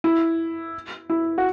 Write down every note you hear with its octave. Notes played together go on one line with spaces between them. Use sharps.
E4
E4
F#4